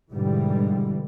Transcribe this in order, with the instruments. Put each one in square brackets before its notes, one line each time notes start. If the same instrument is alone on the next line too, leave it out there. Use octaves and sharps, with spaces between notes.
[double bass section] G#2 B2 D3 E3 G3 G#3